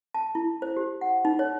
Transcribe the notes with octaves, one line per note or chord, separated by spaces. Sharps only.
A5
E4
C5
G4
F#5
D#4
C#5